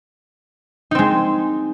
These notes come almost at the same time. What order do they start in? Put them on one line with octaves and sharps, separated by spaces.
D#4 C4 G#3